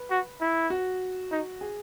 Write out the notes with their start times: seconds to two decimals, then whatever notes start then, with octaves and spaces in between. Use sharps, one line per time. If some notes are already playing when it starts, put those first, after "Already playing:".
Already playing: B4
0.10 F#4
0.41 E4
0.70 F#4
1.31 D#4
1.61 G#4